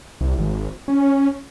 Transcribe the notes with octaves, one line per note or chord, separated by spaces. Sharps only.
C2
G#1
C#4